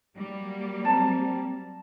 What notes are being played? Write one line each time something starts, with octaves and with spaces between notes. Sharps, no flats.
F#3 G3 A#3
C4 A5 A#5